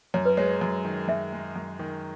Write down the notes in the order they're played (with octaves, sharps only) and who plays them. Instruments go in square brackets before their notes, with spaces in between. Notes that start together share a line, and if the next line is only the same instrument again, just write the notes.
[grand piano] F#2 [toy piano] C#5
[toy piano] B4
[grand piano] G#3 [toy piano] C#5
[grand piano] F#2
D#3
[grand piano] F#2 [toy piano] E5
[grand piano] G#3
F#2
D#3